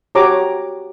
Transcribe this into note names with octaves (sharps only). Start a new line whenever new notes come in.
F#4 G4 C#5 A#5 D6